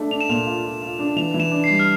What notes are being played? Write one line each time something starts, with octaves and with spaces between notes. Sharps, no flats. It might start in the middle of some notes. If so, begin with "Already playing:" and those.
Already playing: A3 D4
D4 F7
E7
A#2 F7
F4
F4
F4
D4
E3 F7
E3
E7
D4
C7
G3
F6